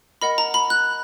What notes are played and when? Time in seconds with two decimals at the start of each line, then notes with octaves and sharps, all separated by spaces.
0.22 A#4 D#5 F#5 B5
0.38 A#5
0.54 B5
0.70 F#6